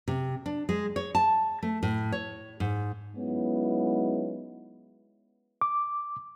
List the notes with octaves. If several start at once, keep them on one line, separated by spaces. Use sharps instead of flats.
C3
D4
G#3
C#5
A5
A3
A2
C#5
G#2
F#3 G#3 B3 C#4 D#4 E4
D6